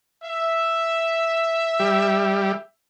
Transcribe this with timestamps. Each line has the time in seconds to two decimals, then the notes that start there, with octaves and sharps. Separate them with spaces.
0.23 E5
1.80 G3